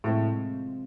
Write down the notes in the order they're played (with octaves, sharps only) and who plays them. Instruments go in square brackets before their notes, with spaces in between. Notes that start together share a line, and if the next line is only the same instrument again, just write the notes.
[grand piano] A2 [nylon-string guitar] C3 F3 G#3 C4